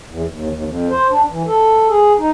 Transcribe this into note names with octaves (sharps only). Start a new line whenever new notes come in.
E2
D#2
D#2
F2
C5
D4
E3
A4
G#4
D#4